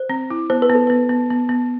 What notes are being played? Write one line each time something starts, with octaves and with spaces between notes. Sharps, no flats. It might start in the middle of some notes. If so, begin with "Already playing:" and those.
Already playing: C5
C4
E4
B3 C5
B4
B3 A4
B3 B4
B3
B3
B3